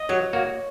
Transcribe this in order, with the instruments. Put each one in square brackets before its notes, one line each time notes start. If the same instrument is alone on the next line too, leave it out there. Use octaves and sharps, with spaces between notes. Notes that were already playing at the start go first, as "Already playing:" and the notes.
Already playing: [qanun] D#5
[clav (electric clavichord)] F#3 [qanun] C#5
[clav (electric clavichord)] A#3 F#4